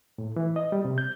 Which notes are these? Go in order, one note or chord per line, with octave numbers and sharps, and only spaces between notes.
A2
E3
D#5
G3
C3
G6